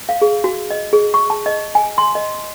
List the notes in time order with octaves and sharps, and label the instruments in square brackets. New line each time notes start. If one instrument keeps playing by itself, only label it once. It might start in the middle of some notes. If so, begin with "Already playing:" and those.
[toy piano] F5
G#4
F#4
D#5
G#4
C#6
A5
D#5
G#5
C6
D#5